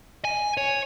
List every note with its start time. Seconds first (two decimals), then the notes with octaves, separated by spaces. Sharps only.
0.25 G#5
0.57 C#5